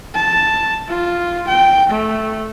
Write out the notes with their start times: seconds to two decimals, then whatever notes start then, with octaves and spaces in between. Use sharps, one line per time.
0.15 A5
0.88 F4
1.48 G5
1.89 A3